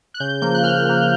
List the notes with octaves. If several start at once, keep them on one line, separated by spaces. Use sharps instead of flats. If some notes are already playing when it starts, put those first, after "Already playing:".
F#6
C#3 G6
F3 A#3 G6
F#6
C#3 F6
F3 A#3